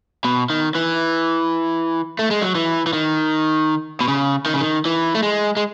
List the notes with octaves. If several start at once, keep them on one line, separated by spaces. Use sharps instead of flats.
B2
D#3
E3
A3
G#3
F#3
E3
E3
D#3
B2
C#3
D#3
C#3
D#3
E3
A3
G#3
G#3